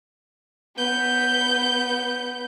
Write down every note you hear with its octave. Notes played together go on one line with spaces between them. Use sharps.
B3 G6